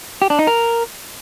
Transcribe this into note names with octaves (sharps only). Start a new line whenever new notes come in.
G4
D4
D#4
A#4